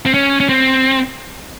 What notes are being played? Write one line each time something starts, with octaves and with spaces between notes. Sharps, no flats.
C4
C#4
C#4
C4